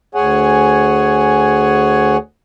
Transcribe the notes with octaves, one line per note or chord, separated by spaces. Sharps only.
D2 G#4 C#5 F#5 G#5